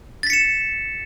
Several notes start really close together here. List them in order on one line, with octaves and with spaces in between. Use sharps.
A6 B6 C#7 E7